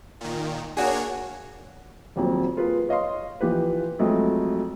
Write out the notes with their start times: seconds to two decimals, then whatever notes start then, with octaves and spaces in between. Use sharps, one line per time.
0.21 A#2 D#3
0.77 A#3 D4 F#4 G#4 C#5
2.16 D#1 F2 F#3
2.57 A#3 F4 G#4 B4
2.89 C#5 D#5 F5 C6
3.41 E3 F3 G4 B4
3.99 F2 F#3 G#3 A3